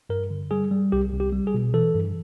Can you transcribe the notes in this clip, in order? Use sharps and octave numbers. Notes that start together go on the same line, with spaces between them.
G2 A#4
D3
G3 G#4
G3
C2 G4
C2
G4
G3
G#4
B2
E3 A4
G2